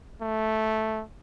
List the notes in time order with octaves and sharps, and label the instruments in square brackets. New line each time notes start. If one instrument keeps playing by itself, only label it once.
[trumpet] A3